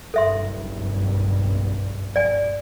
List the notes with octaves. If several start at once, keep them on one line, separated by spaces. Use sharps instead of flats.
F#1 B1 G2 A4 E5 C6
D5 G#5